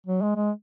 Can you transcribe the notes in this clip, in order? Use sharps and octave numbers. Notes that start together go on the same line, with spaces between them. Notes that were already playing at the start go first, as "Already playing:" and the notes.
F#3
G#3
G#3